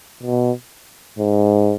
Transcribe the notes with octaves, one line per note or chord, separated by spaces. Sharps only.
B2
G#2